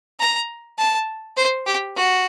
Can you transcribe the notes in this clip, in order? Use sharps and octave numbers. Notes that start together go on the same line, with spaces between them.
A#5
A5
C5
G4
F#4